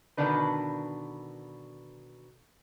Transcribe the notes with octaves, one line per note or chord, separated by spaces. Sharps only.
B2 D3 D#3 D4 B4